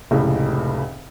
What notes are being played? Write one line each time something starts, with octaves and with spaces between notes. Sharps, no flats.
F1 C#2 A2 C#3